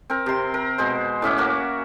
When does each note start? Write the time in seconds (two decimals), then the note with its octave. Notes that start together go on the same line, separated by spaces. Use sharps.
0.10 C4 A#4
0.26 C3 C6
0.54 A#4
0.78 B2 G#3 C5
1.22 A2 C#4 E5 D6
1.38 A#3 F#4